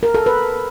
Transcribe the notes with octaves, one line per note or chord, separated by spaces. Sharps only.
A#4
A4
B4